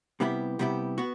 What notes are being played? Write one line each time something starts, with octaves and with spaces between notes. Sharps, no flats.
C3 G3 B3 E4 G4
C3 G3 B3 E4 G4
B3 F#4